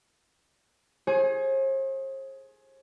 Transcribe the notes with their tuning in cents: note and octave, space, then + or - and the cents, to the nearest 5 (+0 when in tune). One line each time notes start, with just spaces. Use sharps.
G#4 +15 C5 +45